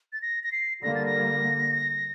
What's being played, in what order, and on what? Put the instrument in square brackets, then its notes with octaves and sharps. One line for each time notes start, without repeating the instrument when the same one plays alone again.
[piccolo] A6
A#6
A#6
C7
[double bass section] D3 G3 A#3 [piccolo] A#6
[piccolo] A6
A#6